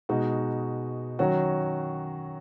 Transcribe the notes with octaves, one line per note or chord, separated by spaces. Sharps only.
B2 G#3 D#4 F#4
D#3 F#3 C#4 F#4